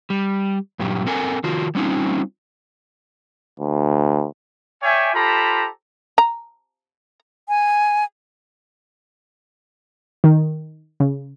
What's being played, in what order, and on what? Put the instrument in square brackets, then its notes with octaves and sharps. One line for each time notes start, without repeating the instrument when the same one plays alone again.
[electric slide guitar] G3
G2 A#2 F#3 G4
C4 A4 A#4 F#5 G#5
D#3 F4 F#4
G3 C4 C#4 D#4 F4
[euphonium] D2
[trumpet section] C#5 D5 E5 G5 G#5
F4 G4 A4 C5 A#5 B5
[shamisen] A#5
[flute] G#5
[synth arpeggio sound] D#3
C#3